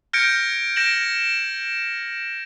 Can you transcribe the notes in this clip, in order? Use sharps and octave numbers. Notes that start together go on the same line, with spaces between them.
F6 G6 G#6 A#6 C#7 D7
G6 A#6 D7 E7 F#7